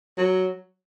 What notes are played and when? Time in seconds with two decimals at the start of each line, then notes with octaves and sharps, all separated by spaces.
0.18 F#3